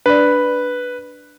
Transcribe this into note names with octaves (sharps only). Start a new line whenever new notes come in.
D4 B4 D5